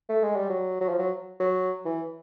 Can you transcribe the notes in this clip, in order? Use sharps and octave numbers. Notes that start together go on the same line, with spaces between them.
A3
G#3
G3
F#3
F#3
F3
F#3
F#3
E3